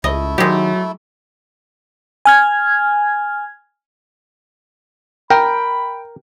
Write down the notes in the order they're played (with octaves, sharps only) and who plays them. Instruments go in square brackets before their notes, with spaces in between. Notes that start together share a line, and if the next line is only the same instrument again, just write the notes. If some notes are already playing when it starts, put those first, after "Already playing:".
[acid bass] C#2 [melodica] A3 E4 [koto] D#5
[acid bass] D#3 [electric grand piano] F#3 [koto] G#3 G4
[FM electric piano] G#5 F6 G#6
[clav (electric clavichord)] A#4 [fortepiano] G5 [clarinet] B5